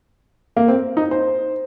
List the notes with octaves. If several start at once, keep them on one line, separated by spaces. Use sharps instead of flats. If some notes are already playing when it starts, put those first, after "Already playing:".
A#3
C4
D#4
C5